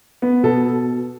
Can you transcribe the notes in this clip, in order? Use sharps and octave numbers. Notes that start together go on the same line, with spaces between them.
B3
B2 A4